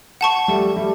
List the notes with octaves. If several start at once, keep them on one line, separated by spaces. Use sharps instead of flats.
F#5 A5 C#6
G3 A3
G3 A3